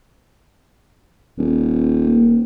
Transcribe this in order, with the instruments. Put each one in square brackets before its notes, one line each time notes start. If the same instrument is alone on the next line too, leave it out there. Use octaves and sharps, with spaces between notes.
[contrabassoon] D#1
[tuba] A#3